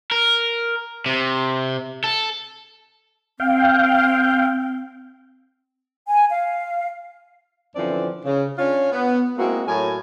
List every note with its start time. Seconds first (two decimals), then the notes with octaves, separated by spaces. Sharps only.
0.11 A#4
1.06 C3
2.04 A4
3.40 C4 F5 G5
6.07 G#5
6.31 F5
7.76 F#2 D3 E3 F3 C4 D5
8.25 C#3
8.59 C#4 D4 F4 C#5
8.92 B3
9.38 G#3 A#3 C4 E4 F#4
9.68 A2 F#3 A#4 G#5